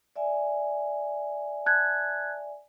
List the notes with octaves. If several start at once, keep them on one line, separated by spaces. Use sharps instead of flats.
D5 E5 G#5
A5 F#6 G#6